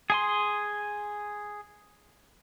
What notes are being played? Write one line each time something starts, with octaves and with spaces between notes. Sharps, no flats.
G#4 G#5 C6